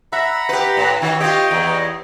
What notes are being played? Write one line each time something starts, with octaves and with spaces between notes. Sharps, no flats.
E5 F#5 A#5 B5
G4 B4
A2
D#3 F#4 C#5
F4 G4 C#5 D#5 G5
E2